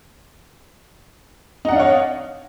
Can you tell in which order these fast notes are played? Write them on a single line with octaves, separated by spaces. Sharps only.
D#4 F#5 D4 F5 C#5